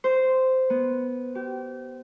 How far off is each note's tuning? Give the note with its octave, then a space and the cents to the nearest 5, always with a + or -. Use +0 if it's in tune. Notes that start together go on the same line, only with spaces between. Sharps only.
C5 -10
B3 -5
G4 -35